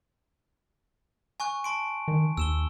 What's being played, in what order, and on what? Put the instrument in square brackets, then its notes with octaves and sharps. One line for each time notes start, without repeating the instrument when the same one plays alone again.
[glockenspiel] G#5 C#6 F#6
A5 C6 D7
[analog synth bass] D#3
[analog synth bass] D#2 [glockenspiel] E6 E7 G7